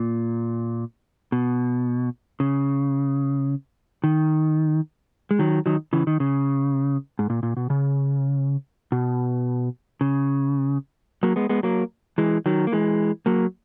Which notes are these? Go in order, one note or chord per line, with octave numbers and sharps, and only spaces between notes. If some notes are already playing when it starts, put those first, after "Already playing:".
Already playing: A#2
B2
C#3
D#3
G#3
D#3 F#3
D#3 F#3
C#3 E3
D#3
C#3
G#2
A#2
A#2
B2
C#3
B2
C#3
F#3 A#3
G#3 B3
G#3 B3
F#3 A#3
E3 G#3
D#3 F#3
A#3
E3 G#3
F#3 A#3